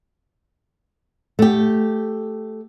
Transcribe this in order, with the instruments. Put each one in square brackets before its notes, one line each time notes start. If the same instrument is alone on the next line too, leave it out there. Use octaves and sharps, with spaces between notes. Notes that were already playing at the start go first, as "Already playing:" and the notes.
[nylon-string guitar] A3 G4